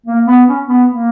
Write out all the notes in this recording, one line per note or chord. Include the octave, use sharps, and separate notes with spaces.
A#3
B3
C#4
B3
A#3